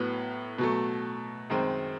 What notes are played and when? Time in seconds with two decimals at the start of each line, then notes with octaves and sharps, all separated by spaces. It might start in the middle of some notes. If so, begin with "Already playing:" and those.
Already playing: A2 F#3 B3
0.58 B2 F#3 A3
1.50 F#2 D#3 G#3 C4